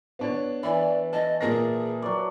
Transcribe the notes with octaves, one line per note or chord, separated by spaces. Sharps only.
B3 D4 C#5
E3 D5
D#5 A5
A#2 G#4 A#4 A#6
F#3 D5